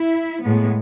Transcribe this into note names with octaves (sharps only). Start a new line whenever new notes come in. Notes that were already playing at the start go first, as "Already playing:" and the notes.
Already playing: E4
A2 G#3 B3